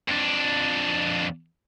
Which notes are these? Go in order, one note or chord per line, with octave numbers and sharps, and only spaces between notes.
F2 D4